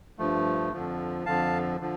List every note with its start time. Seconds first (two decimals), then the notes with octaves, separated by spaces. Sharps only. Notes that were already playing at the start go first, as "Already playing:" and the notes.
0.19 G2 F3 A3
0.73 F2 D3 F3
1.26 F2 D3 F3 F5 A5
1.80 D3 F3